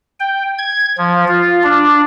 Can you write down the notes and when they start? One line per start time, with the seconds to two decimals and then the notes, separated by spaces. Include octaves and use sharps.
0.20 G5
0.58 G#6
0.98 F3
1.28 F4
1.64 D4